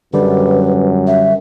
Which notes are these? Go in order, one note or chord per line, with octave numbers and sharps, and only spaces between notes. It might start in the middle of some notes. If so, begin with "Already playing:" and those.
F#2 D3 G3 B4
E5